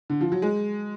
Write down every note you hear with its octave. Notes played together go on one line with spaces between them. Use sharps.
D3
F3
F#3
G#3